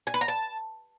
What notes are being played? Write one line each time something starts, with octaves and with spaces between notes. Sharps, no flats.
G#5
B4
A#5
A5